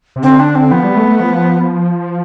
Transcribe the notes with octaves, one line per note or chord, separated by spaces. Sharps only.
C3
D3 C4
D4
C4
F3 B3
G3
A3
A3
F3